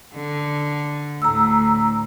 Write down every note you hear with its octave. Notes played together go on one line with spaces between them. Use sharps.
D3
D2 A2 A#5 E6